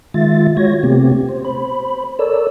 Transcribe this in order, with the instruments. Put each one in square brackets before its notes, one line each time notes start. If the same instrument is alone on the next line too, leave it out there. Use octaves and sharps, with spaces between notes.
[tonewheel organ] D#3 G#3 F4 E5 A6
G#3 F4 F#4 C#5 G#6 A#6
C3 A3 B3 C4 G4
C5
C5 B5
A4 A#4 C#5 D5 E6